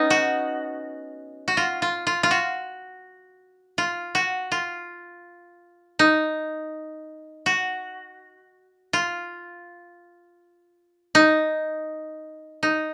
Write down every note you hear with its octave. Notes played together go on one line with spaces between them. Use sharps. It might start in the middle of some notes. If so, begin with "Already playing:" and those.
Already playing: B3 C#4 D#4
F#4
F#4
F4
F4
F4
F4
F#4
F4
F#4
F4
D#4
F#4
F4
D#4
D#4